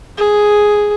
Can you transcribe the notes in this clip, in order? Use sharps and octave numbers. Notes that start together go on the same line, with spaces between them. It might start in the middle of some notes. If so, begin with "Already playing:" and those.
G#4